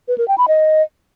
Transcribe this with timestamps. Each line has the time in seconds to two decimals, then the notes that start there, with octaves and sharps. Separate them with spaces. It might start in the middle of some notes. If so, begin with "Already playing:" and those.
0.08 B4
0.18 A#4
0.28 G5
0.38 B5
0.48 D#5